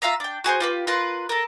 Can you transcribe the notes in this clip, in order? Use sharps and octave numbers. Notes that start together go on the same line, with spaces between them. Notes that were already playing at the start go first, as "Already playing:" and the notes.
F4 E5 F5 A#5
D4 G5
F#4 G#4 A#4 C5
F4 G4 B4
F4 A#4 B4 C6
A4 A#4